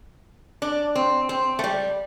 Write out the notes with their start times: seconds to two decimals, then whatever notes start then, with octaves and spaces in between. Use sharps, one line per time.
0.62 D4
0.95 C4
1.29 C4
1.59 A3
1.64 G3